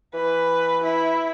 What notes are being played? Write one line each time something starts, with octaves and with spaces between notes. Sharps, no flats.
E3 B4
E4